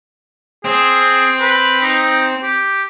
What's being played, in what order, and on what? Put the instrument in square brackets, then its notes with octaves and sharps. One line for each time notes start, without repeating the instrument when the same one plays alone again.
[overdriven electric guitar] C4 [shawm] G#4
[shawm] B4
D#4
G4